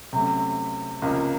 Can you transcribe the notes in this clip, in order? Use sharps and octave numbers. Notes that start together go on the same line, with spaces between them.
C3 F#3 A3 C#4
C#2 C3 F3 A#3 C#4